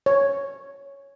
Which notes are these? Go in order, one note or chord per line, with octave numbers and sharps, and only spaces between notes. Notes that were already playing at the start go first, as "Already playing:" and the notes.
C#5